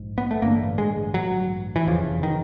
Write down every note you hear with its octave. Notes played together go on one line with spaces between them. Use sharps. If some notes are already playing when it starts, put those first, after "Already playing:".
Already playing: A#1 G#2
B3
A3
A1 G2 D3 A#3
G#3
F#3
E3
F1 E2 C#3 F3
D#3